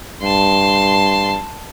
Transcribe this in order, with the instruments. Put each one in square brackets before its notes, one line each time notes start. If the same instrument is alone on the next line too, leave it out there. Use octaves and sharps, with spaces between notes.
[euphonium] G2 [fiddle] A5 C6